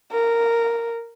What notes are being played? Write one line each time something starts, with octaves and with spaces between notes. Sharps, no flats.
A#4